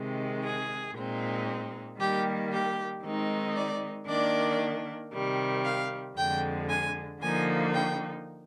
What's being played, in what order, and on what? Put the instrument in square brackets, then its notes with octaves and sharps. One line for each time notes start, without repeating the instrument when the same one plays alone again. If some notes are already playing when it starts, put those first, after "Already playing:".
Already playing: [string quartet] C3 D#3 G#3
G#4
A#2 G#3 C4 D#4
D#3 G3 A#3 G4
G4
D#3 G#3 C4 D#4
D5
D#3 A#3 D4 D5
C3 D#3 G3
F5
F2 D3 G#3 G5
G#5
D3 F3 A#3 D#4 G#5
G5